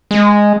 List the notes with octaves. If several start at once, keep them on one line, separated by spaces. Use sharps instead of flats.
G#3